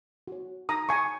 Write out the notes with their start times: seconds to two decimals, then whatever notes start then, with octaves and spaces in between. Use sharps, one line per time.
0.27 F#4 C#5
0.69 D#4 A#5 D#6
0.89 G#5 C#6